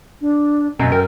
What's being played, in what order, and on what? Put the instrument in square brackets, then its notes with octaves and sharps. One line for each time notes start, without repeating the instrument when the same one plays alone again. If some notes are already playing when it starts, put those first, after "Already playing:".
[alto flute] D4
[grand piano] F#2 [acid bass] B2 [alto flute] G#5
[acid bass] A#4 [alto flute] G5